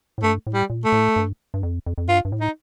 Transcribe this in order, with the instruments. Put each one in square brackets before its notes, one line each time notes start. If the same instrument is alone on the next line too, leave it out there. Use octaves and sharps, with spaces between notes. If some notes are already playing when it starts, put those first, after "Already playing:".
[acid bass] A2
[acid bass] G2 [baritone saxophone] A3
[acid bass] A2
[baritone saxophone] G3
[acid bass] A#2
[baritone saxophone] A3
[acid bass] A2
G2
G2
F2
F2
F2
[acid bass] G2 [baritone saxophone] F4
[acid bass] G2
A2
[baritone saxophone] D#4